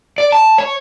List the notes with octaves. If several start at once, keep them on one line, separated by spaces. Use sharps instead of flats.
D5
A5
C#5